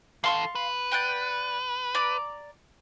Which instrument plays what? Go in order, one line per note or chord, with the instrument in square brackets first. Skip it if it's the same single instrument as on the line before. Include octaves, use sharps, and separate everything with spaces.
[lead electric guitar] E3 A4 [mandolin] F5 C6 C#6
[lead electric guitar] B4
[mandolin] D5 F#5 G5
D5 A#5 D6